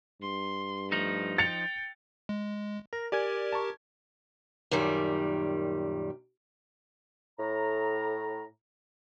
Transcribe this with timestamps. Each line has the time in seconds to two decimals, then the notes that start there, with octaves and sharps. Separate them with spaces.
0.22 G2 C6
0.92 F3 A3 D#4
1.38 G5 A6 C#7 F7
2.29 G#3
2.93 A#4 A#6
3.12 G4 A#4 D5 G#5 G#6
3.52 A5 A#5 C#6
4.71 F#2 A#2 D#3 G3
7.39 A2 A#5